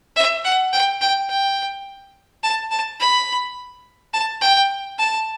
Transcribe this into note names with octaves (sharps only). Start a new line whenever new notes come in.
E5
F#5
G5
G5
G5
A5
A5
B5
A5
G5
A5